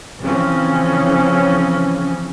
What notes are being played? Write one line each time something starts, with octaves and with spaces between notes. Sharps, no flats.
C#3 E3 F3 C4 C#4